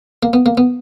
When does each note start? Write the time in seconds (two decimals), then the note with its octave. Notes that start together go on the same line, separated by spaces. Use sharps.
0.23 A#3
0.33 B3
0.46 A#3
0.57 B3